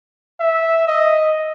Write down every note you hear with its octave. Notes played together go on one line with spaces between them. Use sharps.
E5
D#5